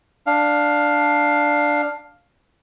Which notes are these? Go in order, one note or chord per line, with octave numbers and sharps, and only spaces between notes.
D4 F5